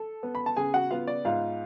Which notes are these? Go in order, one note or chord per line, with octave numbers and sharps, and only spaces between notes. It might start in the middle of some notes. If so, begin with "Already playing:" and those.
Already playing: A4
B3
B5
A5
C#3 G#4 G#5
F#4 F#5
B3 F4 F5
D5
G#2 F4 F5